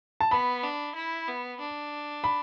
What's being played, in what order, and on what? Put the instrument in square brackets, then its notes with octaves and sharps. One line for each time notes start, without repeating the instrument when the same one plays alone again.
[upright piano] A5
[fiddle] B3 [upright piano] B5
[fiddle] D4
E4
B3
D4
[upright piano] B5